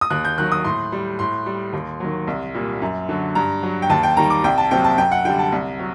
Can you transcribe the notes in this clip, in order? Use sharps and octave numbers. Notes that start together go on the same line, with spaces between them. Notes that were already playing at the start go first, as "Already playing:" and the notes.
D#6
D#2 F#6
G6
D#3 F#3 F#6
D#6
A2 C6
G3
A2 C6
G3
D#2
D#3 F#3
C2
A#2 G3
F#2
D3 F#3
G2 A#5
F#3
G5
D#2 A5
G5
D#3 G3 A#5
D6
C2 G5
A5
C3 F#3 G5
A5
F#2 G5
F#5
D3 G3 G5
A5
C2
F#3